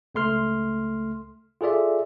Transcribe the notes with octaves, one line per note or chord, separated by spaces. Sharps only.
C#2 A3 C6 F6
F4 G#4 A4 D5 E5